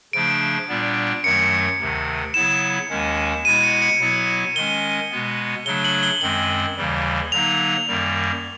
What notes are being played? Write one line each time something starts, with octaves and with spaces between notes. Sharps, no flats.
C#3 F3 A3 D4 D7
A#2 G3 B3 D4
F#2 D#3 F#3 A3 C#7
D2 C3 D#3
C#3 F#3 B3 E4 E7
D#2 D#3 G#3 C#4
B2 G#3 B3 E4 D#7
C#7
C#7
B2 F#3 B3 E4
D#3 G#3 C#4 G7
B2 G#3 B3
C#3 F#3 A3 D4 G7
F#7
G7
F#2 D#3 G#3 C4 F#7
D#2 C#3 E3 G3
D3 F#3 A#3 D#4 F7
F#2 D#3 G3 A#3